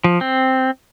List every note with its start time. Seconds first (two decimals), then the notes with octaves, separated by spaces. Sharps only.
0.04 F3
0.21 C4